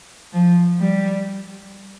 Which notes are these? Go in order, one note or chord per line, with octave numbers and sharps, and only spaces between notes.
F3
G3